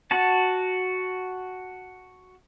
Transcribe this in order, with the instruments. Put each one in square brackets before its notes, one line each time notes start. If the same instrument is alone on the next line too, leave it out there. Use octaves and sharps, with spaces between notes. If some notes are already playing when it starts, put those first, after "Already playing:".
[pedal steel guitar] F#4 F#5 A5